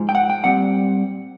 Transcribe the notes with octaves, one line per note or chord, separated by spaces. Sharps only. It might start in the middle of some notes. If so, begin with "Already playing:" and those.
Already playing: G#2 F3 G#3
G5
F#5
G5
A#2 G3 C4 F#5